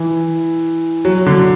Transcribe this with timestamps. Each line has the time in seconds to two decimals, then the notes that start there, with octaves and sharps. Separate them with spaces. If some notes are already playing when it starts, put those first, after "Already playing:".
Already playing: E3
1.05 F#3
1.26 D3